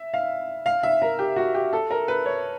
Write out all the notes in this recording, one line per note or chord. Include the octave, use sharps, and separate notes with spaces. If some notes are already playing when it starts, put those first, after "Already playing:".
Already playing: E5
F5
F5
E5
A#4
G4
F#4
G4
A4
A#4
B4
C#5